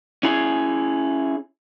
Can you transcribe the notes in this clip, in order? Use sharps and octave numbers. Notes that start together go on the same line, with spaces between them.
C#4 E4 G#4